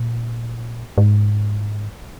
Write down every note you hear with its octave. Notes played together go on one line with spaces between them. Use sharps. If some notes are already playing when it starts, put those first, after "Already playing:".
Already playing: A#2
G#2